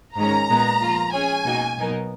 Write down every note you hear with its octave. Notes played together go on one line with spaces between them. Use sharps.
G#2 D#3 G#3 C#4 A#5
A#2 G#3 B3
F3 A#3 F4
G#3 C#4 G#4 C#5 G#5
B2 A#3 D#4 F#4
B2 F#3 B3 D#4 A#4